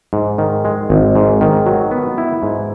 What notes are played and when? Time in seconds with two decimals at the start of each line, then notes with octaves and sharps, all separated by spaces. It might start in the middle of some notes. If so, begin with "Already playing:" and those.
0.13 G#2
0.38 D#3
0.65 G#3
0.90 G#1
1.16 G#2
1.41 D#3
1.66 F#3
1.91 B3
2.18 E4
2.43 G#2